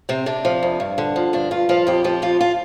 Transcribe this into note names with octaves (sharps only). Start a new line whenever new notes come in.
C3 C4
C3 D4
F3
F2
G2
D3
F3
G2 D4
G2 F4
F3 F4
F2 G4
F3 G4
F2 F4
F4